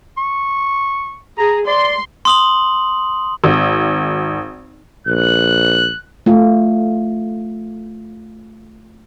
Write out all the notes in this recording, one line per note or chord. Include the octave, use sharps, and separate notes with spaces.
C#6
G#4 A#5
D5 C6
C6 D#6 F#7
G#1
A#1 F#6
A3 F4